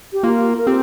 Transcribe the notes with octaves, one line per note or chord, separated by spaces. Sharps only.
G4
A#3 F4
A#4
C4 G4